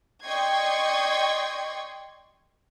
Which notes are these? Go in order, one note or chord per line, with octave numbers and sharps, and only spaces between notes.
D5 D#5 G5 C6 C#6 G#6